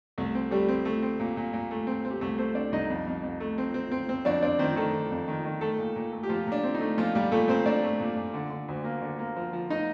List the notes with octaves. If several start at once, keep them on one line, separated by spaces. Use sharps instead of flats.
C2 A3 A4
C4
G3 A3 G4
C4
A3
C4
A#2
A#2
A#2
A3
C4
C4
G4
C2 A3 A4
A3 C4 C5
C4 D4 D5
C2 D#4 D#5
F2
F2
F2
A3
C4
C4
C4
C4
F2 D4 D5
C4 D4 D5
D#3 C4 C5
D#3 A3 A4
D#3
F2
D#3
D#3
A3 A4
A#2
A#2
A3
G4
A#2 F3 F4
A#2 D4
C4
D#4
A3
A#2 F3 F4
A#2 G3 G4
A#2 A3 A4
A#2 C4 C5
A#2 D4 D5
A3
A#2
A#2
D3
D3
D2
A#3
D3
A#3
F3
F3
D#4 D#5